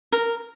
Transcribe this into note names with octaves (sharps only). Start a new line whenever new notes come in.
A#4